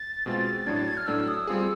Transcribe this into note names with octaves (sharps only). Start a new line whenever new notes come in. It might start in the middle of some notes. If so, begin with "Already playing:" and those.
Already playing: A6
B2 G#3 C4 F4
A2 F#3 A3 D4 G#6
A6
G#6
F6
A2 F#3 A3 D4 E6
D#6
G3 C4 F4 G#4 E6